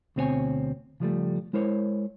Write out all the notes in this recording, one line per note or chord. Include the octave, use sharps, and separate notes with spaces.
D2 B2 C4 F4 C#5 G#5
C#3 F3 G3 A3
G#3 E4 A#4 C5 C#5